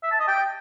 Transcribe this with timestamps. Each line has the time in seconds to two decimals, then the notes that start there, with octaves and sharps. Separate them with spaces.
0.03 E5
0.11 A5
0.20 D#5
0.28 G5